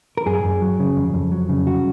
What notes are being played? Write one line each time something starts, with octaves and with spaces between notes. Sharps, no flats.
A#4
F#2 G#4
F#2
F#3
C#3
F2
F2
F#3
C#3
C2 F#4